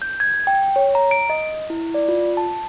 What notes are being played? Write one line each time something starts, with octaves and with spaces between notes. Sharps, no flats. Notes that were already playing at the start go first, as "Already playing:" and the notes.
G6
G#6
G5
C#5
A#5
D7
D#5
E4
D5
F4
A5